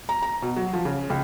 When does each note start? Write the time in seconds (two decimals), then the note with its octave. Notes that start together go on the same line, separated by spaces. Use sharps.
0.09 A#5
0.23 A#5
0.42 B2
0.56 F#3
0.73 F3
0.85 C#3
1.10 C#2